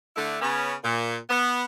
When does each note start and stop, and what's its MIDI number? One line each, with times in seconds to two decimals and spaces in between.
0.16 0.37 50
0.16 0.37 57
0.16 0.37 62
0.16 0.37 64
0.41 0.74 49
0.41 0.74 59
0.41 0.74 61
0.83 1.17 46
1.30 1.64 59